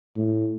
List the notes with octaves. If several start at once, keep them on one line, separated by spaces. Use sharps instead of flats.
A2